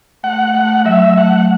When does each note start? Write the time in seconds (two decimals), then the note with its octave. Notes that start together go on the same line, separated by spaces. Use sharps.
0.23 A3 F#5
0.54 A3 F#5
0.85 F#3 E5
1.16 A3 F#5